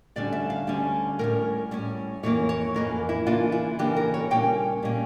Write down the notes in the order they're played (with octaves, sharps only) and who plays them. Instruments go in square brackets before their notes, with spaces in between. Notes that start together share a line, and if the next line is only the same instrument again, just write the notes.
[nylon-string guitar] D2 D3 G3 C#4 D5
E5
F5
D2 D3 G3 C#4
A2 G3 C#4 A#4
A2 G3 C#4
F2 E3 A#3 C#4 C#5
C#5
F2 E3 A#3 C#4 A#4
E4
C#3 E3 A#3 D4 F4
E4
C#3 E3 A#3 D4 G4
A#4
C#5
A#2 G3 A#3 C#4 G5
A#2 G3 A#3 C#4